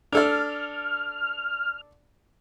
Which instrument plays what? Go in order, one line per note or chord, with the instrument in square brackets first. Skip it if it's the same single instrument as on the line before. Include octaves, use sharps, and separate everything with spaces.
[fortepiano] D4 A4 D5 [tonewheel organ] F6